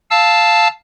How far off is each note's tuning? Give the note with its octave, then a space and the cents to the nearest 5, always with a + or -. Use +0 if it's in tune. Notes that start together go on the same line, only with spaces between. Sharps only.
F5 +0 A5 +0 E6 -5